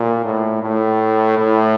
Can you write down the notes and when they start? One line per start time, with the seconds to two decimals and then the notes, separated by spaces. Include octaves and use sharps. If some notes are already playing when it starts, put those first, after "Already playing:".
Already playing: A#2
0.24 A2
0.62 A2
1.38 A2